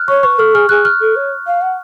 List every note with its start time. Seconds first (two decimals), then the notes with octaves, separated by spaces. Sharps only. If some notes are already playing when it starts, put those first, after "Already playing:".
Already playing: F6 F#6
0.08 C#5 C#6
0.23 B4 C#6
0.38 A4 F6
0.54 G#4 F6
0.69 G#4 F#6
0.85 F6
1.00 A4
1.16 C#5
1.46 F5
1.61 F#5